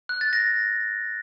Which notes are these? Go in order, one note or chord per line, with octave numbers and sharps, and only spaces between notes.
F#6
A6
A#6